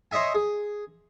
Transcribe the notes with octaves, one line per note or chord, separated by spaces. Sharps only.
C5 C#5 D#5 E5 G#5
G#4